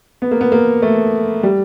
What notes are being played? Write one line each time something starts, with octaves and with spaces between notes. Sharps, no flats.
B3
A#3
B3
A#3
A3
G3